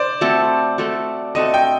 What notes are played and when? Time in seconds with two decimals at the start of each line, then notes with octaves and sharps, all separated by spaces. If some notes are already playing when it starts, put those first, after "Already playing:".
Already playing: C5 D5
0.21 A3 C4 F#4 A4
0.78 A3 C4 F#4 A4
1.35 A3 C4 F#4 A4 D#5
1.54 G5